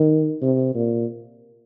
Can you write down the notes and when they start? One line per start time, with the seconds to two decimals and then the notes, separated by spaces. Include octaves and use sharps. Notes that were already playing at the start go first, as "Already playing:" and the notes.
Already playing: D#3
0.42 C3
0.75 A#2